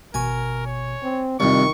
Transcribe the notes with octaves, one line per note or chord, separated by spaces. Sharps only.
G#1 B2 A#4 G#5 C#6
C#5
C4
C2 F2 C3 D#3 C4 C#6